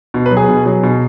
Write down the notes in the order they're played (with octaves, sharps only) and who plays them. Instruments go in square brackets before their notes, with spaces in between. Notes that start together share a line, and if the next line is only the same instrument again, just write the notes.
[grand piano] B2
B4
F#3
G#4
B2
F#3
B2